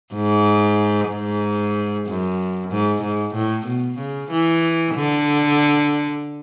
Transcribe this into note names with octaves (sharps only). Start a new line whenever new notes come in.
G#2
G#2
F#2
G#2
G#2
A2
B2
C#3
E3
D3